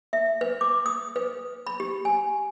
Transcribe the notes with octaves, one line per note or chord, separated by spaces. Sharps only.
E5
B4
D6
D#6
B4
B5
G4
G#5